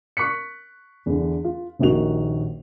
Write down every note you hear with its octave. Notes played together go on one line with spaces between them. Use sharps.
C#6 F#6 B6 C#7
E2 D3
F4
D#1 A#1 D#3 F#4 F7